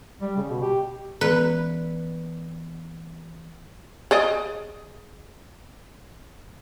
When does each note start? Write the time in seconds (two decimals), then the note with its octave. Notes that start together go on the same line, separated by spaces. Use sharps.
0.21 G3
0.37 C#3
0.50 B2
0.62 G4
1.21 E3 B3 B4 D5
4.11 G#4 D5 D#5